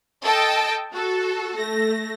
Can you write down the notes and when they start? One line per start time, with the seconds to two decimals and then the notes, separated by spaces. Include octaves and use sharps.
0.23 A4 D#5 G5 A5
0.92 F#4 A4
1.57 A3 A#6